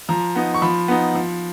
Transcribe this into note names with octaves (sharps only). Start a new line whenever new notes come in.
F3 A#5
B3 D#4
C#6
F3 B5
B3 D#4
F3